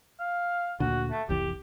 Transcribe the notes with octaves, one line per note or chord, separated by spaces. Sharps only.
F5
D2 A#2 D3 F#4
A3
F1 C2 E3 G4